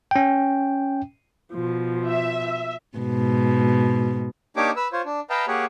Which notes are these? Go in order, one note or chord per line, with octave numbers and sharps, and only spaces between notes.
C#4 G5
B2 F3
E5
G#2 B2
A#3 D4 D#4 G4 C#5 D6
B4 E6
F4 C5 C#5
D4
B4 D#5 F5 G5 A5 A#5
A#3 G4 G#4 C#5 F#5